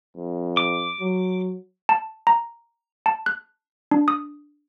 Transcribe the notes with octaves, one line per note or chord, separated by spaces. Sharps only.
F2
D6
F#3
A5
A#5
A5
F#6
D4
D#6